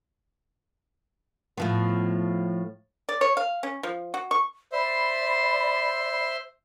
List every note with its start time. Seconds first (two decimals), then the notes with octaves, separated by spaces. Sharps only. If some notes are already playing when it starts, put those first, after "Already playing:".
1.57 A2 F3 B3
3.09 D5
3.21 C#5
3.37 F5
3.63 C#4
3.83 F3
4.14 F#4
4.31 C#6
4.73 C5 D5 E5 B5 C6